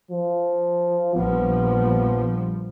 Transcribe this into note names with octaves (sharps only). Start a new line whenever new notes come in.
F3
A#1 F3 G3 B3